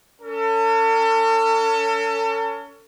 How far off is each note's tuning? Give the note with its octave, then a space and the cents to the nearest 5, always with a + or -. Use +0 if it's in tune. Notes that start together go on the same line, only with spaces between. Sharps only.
C#4 +25 A4 +40